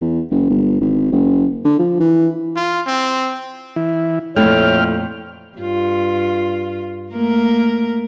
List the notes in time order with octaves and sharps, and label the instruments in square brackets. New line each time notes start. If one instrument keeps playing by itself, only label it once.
[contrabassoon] E2
F#1
G1
G#1
F#1
D3
F3
E3
[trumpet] F4
C4
[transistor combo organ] E3 E4
[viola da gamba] F2 A#2 [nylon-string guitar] A3 E4 [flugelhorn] C#5 [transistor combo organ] G5 F6
[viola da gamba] G2 F4
A3 A#3 A#4